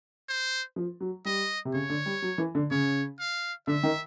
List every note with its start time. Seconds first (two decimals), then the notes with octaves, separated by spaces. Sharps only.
0.29 C5
0.76 F3
1.01 F#3
1.25 G3 D#5
1.65 C3
1.74 C#3 C#5
1.89 D3
2.06 G3
2.22 F#3
2.38 E3
2.55 D3
2.71 C#3 C#5
3.19 F5
3.67 D3 E5
3.83 D#3